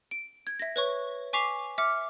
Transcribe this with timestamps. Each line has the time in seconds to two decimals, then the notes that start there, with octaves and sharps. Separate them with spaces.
0.11 D7
0.47 G#6
0.59 E5 A#6
0.76 B4 C#5 C#6
1.33 G#5 C#6 D6 B6 C7 F7
1.78 E5 D6 F6 C#7